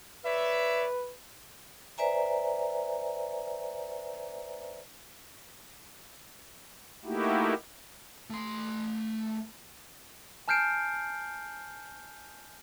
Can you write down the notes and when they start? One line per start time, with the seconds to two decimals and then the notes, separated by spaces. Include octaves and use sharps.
0.25 B4 C#5 D5 E5
1.98 B4 C5 D5 E5 G#5 A#5
7.05 A3 A#3 D#4 E4 F#4 G4
8.30 A3 C6
10.48 G#5 A5 F6 G6 C7 D7